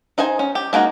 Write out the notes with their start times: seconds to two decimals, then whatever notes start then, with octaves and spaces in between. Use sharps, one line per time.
0.18 D#4 G#4 C5 G#5
0.39 C#4
0.55 G4
0.73 G#3 A#3 D#4 F#4